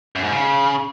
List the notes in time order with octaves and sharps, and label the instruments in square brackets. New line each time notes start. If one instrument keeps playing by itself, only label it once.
[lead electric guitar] F#2
G#2
C#3